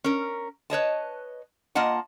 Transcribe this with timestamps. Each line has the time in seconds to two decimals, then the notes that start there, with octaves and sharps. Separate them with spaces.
0.04 C#4 A#4
0.70 B4 C#5 D#5 A5
1.75 A#3 F4 D#5 F#5 A5